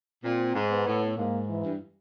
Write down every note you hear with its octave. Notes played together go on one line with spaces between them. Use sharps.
A#2 C4
G#2
B3
A2
G#2 A#3
E3
G2